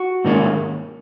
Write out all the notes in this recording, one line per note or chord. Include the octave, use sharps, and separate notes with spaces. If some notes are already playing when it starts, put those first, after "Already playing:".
Already playing: F#4
G#2 D#3 A#3 C#4